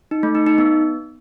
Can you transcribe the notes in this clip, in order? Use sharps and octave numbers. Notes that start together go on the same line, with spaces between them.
D#4
A3
D#4
D#4
B3